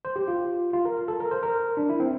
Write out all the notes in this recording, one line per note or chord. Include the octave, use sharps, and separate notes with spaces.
C5
G4
F4
F4
A#4
A4
A#4
C5
A#4
D4
E4
C4